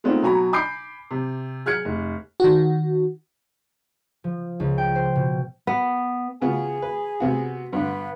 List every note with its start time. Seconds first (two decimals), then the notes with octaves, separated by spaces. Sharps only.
0.04 G#3 A3 B3 C4 D#4 F4
0.22 B2 F#3 G#5 A#5 B5
0.53 G#5 B5 D6 G6 C7 D7
1.11 C3
1.66 G#4 F6 F#6 G#6 C#7
1.85 F1
2.40 D#3 F#4
4.24 F3
4.60 C#2
4.78 G5
4.95 C5
5.16 B2
5.67 B3
6.42 C#3 B3 F4 G#4
6.82 B4
7.20 C3 B3 F#4
7.73 G2 D3 B3